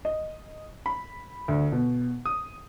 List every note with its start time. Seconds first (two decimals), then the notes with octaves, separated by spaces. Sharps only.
0.05 D#5
0.86 B5
1.48 D2
1.72 B2
2.26 D#6